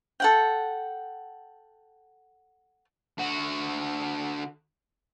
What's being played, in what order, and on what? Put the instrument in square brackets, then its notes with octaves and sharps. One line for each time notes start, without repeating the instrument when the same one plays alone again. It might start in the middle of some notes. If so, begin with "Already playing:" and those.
[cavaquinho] A4 F#5 G5
[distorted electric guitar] D3 F#4